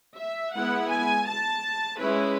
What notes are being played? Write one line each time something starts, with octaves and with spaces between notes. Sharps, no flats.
E5
G#3 B3 E4 F#5
G#5
A5
G#3 C#4 E4 B4